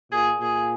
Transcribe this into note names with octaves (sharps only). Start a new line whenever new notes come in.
A#2 G#4
A#2 G#4